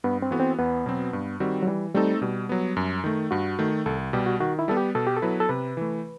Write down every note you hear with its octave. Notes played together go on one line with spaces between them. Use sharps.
G2 B3
C4
E3 B3 F#4 A4
C4
E2 B3
B2 F#3 C4
G2
D#3 G3 C4 F#4
F#3
E3 G3
G3 A3 C4 D#4 A4
B2 G3
F#3 B3
F#2
D#3 A3
G2 F#4
D#3 A3
C2 A4
B2 G3 G4
F#4
D#3 F#4
E4
G3 B3 A4
G4
B2 A4
G4
A4
F#3 B3 E4 B4
A4
C3 B4
E3 A3